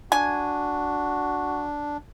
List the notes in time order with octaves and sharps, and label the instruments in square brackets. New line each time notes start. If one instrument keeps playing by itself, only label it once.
[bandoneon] D4 [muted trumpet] F#4 [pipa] G#5